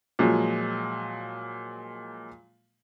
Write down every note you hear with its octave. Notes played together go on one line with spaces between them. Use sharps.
A#2 F3 F#3 G#3